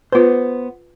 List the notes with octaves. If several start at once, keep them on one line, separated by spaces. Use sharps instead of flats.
B3 F4 B4 C5